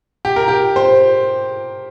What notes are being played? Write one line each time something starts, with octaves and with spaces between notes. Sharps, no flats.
G4
A#4
G4
C5